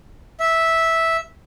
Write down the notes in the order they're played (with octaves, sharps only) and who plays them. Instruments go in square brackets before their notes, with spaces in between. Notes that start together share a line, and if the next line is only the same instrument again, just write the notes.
[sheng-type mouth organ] E5